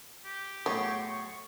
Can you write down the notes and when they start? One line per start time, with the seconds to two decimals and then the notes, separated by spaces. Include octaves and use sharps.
0.25 G4
0.66 A2 F#3 B3 G#4 C#6